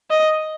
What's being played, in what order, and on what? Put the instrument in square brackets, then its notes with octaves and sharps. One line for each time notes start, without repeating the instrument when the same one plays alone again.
[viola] D#5